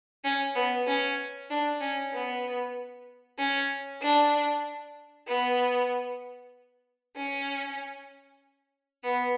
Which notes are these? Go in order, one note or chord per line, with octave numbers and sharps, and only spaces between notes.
C#4
B3
C#4
D4
C#4
B3
C#4
D4
B3
C#4
B3